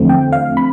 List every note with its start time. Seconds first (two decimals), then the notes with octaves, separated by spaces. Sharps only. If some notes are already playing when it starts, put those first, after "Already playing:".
Already playing: E2 D3 F3 A3 C4
0.09 G5
0.33 F5
0.57 B5